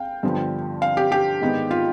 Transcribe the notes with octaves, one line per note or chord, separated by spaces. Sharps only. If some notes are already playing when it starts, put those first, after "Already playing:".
Already playing: G#3 F5 G5
G2 D3 F3 B3
F5
G4
G4
G#2 D#3 B3
F4